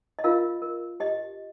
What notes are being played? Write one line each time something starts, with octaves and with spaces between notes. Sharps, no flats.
D#5
F4 A#4 F5
A#4
G4 D#5